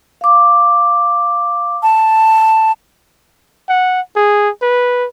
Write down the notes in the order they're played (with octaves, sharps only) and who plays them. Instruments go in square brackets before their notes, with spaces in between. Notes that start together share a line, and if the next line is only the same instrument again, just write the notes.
[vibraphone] F5 D6
[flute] A5
[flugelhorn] F#5
G#4
B4